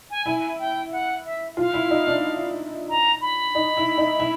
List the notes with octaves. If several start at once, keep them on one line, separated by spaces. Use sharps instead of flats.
G#5
E4 G#5
G5
F#5
E5
F4 F5
E4
D#4
D4
A#5
B5
D#4
E4
D#4
E4